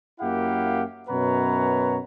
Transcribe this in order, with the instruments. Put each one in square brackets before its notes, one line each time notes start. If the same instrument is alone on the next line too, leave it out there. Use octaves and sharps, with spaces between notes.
[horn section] F#2 A#3 E4 G4 F5 F#5
F#2 B2 B4 C#5 F#5 A#5